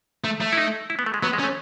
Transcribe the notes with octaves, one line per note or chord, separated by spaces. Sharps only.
A3
A3
E4
D#4
E4
B3
A3
G#3
F#3 B3
G#3
C#4
A3